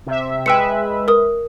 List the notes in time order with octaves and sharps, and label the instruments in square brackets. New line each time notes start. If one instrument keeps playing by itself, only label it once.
[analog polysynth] C3 E5
[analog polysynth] G#3 B4 E5 [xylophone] G5 E6 C#7
[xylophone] A#4 D#6